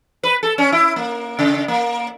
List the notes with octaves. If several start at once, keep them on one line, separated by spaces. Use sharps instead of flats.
B4
A4
C#4
E4
A#3
C#3
A#3